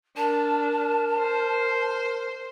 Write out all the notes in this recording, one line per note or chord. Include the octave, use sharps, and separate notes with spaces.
D4 A#4 A5
C5